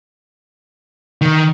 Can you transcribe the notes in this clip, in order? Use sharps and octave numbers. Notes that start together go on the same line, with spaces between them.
D#3